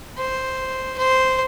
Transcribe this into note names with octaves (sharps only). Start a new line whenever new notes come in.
C5
C5